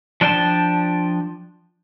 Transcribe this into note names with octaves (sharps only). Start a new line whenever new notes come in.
F3 D4 D5 G5 A5